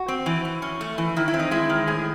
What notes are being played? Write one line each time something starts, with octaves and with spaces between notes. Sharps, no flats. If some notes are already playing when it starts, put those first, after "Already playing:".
Already playing: F#4
C4
E3
E3
C#4
A3
E3
D#3 E4
E4
C4
D#4
G#3 E4
D#3
A2 G#4